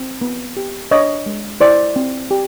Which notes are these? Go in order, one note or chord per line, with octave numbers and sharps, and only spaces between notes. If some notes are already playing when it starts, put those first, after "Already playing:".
Already playing: C4
B3
G4
D4 C#5 D#5
G#3
E4 C5 D5
C4
G4